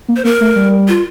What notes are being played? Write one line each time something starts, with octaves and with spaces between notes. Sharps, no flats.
A#3
C5
A#3 A#4
A3
G3
F4